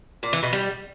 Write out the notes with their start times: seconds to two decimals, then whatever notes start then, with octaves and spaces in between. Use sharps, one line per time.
0.23 A#2
0.33 E3
0.43 B2
0.53 G3